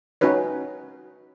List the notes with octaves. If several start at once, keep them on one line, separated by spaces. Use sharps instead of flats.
C#4 D#4 F#4 B4 C#5